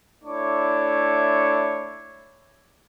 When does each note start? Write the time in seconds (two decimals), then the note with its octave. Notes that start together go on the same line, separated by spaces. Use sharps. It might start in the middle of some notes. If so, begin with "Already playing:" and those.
0.24 A3 D4 E4 C#5 C#6 D6